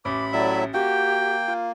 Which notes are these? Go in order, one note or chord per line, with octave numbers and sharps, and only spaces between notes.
A1 B5 D6
A2 F#3 D5 E5
A#3 F#4 G4 G5
F4